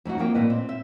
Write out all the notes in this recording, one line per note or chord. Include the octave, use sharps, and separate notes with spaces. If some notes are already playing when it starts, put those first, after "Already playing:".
F2 A3 D#4 F#4
F2 F3 A#3 G5
A#2 A4 B4 D#5
C4
E5